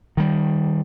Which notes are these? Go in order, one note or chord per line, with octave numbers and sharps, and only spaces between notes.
D#3 G3